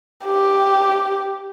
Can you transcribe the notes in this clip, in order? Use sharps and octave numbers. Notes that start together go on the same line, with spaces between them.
G4